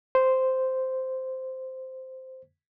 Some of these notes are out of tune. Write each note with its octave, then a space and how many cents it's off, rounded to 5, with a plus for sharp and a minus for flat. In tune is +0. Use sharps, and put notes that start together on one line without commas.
C5 -5